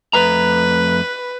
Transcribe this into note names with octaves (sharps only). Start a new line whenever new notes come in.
F2 A3 B4 A#5